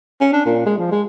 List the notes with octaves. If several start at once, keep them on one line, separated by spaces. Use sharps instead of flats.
C#4
D4
A#2
G#3
F3
G#3